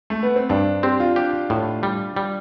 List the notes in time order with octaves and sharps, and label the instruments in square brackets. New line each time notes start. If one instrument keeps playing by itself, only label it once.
[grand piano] A3
B3
C4
[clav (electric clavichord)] G2 [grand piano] D4
[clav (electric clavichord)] C4 [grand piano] G4
[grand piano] F4
[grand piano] D4 [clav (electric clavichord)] G4
[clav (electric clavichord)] A2
G3
G3